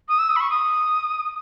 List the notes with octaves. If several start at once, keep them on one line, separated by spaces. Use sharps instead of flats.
D#6
E6
D#6
B5
C#6
D#6